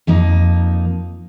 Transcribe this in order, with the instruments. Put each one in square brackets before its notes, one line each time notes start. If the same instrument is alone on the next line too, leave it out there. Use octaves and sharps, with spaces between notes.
[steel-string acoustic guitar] F2 F3 A#3 D#4